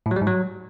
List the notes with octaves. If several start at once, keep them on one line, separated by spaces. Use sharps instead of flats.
A2
F#3
G3
G#2
F#3